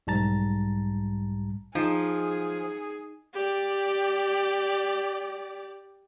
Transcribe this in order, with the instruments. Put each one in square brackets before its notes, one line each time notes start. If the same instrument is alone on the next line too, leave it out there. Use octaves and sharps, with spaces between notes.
[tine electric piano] B1 G#2 G3 A5 A#5 A6
[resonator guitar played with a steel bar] F3 [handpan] D#4 [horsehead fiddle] G#4
[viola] G4 D5